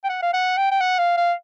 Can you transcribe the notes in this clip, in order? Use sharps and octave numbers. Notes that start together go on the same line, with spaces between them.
G5
F#5
F5
F#5
G5
G5
F#5
F5
F5